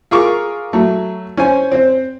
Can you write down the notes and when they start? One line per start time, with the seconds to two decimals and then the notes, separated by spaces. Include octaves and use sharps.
0.11 F4 G#4 A#4 C#6 D6
0.73 F#3 A3
1.37 C#4 C5 G#5
1.72 C4 C5